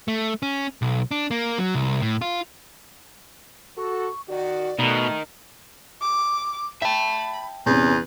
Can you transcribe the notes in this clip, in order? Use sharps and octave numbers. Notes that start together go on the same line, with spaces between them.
A3
C#4
B1
D4
A#3
F#3
C2
A2
F4
F#4 A4 C#6
D#3 F#4 D5
B2 A3 D#4 A#4
D6
E5 G5 A5 B5
E2 C3 B3 C#4 B4